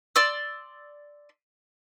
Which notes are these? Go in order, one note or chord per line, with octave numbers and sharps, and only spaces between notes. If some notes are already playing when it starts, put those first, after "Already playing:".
D5 C6 E6